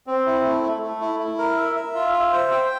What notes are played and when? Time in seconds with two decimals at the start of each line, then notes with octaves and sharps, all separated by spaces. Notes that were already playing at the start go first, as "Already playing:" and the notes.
0.07 C4
0.26 E4
0.44 A3
0.63 A3
0.82 A3
1.01 E4
1.20 E4
1.39 A#4
1.57 E5
1.76 E5
1.95 F4
2.13 E5
2.32 C5
2.51 G5